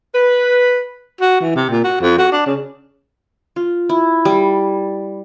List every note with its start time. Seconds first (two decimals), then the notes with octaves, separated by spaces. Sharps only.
0.13 B4
1.21 F#4
1.41 E3
1.56 C3
1.70 A#2
1.84 F#4
2.01 F2
2.19 F#4
2.32 D4
2.46 C#3
3.56 F4
3.89 E4
4.25 G3